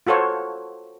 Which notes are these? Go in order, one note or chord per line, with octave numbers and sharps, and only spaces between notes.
F4 F#4 A4 C5 C#5